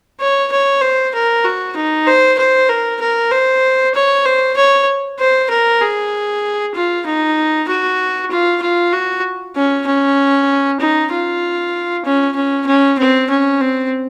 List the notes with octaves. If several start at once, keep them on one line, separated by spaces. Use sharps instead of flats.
C#5
C#5
C5
A#4
F#4
D#4
C5
C5
A#4
A#4
C5
C#5
C5
C#5
C5
A#4
G#4
F4
D#4
F#4
F4
F4
F#4
C#4
C#4
D#4
F4
C#4
C#4
C#4
C4
C#4
C4